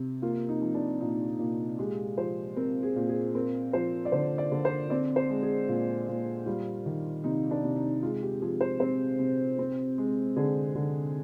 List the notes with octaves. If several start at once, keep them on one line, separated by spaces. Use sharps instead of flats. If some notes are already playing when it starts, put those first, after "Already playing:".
Already playing: C3
A#3 F4
D#4
F3
D4
A#2 D#4
A#2
G#3 G4
F3 C5
C4 A#4
G#4
A#2
G#4
C4 A#4
F3 C5
D5
D3 C5
D5
D3
C5
C4 D5
C5
G#3
G#4
A#2
A#2
G3 F4
D#3
C3 D#4
D4
C3
D#4
G#3 F4
G4
F3 G#4
C5
C4 C5
C3
C4
G#3
D3 G#4
D3